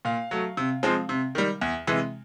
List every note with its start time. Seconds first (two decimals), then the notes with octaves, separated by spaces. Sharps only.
0.05 A#2 F5
0.31 F#3 A3
0.57 C3
0.83 F3 G#3 C4
1.09 C3
1.35 D#3 G3
1.61 E2
1.87 C3 E3 G#3